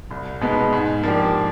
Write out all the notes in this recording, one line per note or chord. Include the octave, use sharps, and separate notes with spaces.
C2
B2 G#3 B3 D#4
G#2
F3 A#3 D4 G4